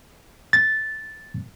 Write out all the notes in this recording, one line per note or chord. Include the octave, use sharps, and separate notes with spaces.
A6